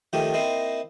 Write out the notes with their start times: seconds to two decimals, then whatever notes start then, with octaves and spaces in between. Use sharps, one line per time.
0.13 D#3 F3 A3 D#4 G4
0.34 A#3 C4 D#4 E4